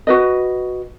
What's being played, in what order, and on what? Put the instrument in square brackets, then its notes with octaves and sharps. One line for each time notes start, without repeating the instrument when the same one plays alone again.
[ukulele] F#4 B4 D#5